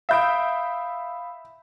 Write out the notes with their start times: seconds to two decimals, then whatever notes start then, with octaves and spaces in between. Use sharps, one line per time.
0.09 E5 F5 B5 D#6 G6 D7